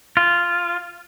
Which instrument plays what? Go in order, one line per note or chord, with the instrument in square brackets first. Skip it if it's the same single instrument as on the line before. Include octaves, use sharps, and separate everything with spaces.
[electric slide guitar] F4